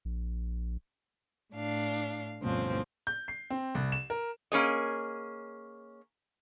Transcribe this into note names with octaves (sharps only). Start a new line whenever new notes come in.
A#1
A2 D4 F5
D2 G2 B2 F3 C4 C#4
G6
C7
C4
C2
E7
A#4
A#3 C#4 G#4 D#5